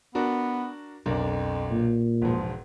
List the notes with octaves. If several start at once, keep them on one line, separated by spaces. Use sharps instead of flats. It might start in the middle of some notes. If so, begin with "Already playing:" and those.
B3 D4 F#4 A#4
B1 F2 D4 A#4
A#2
E1 G#2 F3